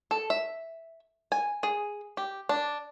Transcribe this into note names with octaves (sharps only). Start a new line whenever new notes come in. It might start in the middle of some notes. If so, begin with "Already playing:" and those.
A4
E5
G#5
G#4
G4
D4